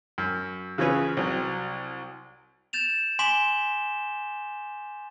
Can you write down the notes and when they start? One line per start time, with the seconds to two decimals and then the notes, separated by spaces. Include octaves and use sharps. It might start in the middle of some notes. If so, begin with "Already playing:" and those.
0.18 F#2
0.78 C#3 E3 F3 C#4 G#4 B4
1.17 C2 F#3
2.73 G6 A6 E7 F7
3.19 G#5 C6 D6 B6 E7 G7